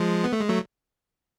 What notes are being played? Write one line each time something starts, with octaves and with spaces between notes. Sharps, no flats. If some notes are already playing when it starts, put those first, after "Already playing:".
Already playing: F3 G#3
B3
A3
G#3
F#3 A3